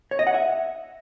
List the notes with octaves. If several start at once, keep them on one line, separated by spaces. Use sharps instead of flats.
C#5
D#5
F#5
E5